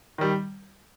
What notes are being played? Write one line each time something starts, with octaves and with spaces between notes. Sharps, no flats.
D#3 G3